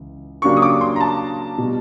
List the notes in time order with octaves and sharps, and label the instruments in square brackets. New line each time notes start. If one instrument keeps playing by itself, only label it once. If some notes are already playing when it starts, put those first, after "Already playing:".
Already playing: [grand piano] C#2 E3
[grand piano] C#3 F#3 A#3 D4 G4 [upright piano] C#6
[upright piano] D#6
D6
C6
A#5
A5
[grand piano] B2 G3